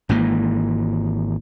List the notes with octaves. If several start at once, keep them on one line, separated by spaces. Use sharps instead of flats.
G#1 G#2 E3 A#3